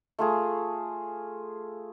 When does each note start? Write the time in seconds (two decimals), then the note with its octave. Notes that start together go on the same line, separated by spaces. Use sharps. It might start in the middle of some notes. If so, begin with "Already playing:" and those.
0.19 A3 F4 G#4